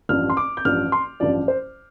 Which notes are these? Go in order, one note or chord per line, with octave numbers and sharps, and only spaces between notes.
A1 G2 F3 F6
C6
D6
G6
A1 G2 F3 F6
C6
A1 G2 F3 D5
C5